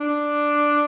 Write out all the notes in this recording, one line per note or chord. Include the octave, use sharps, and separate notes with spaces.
D4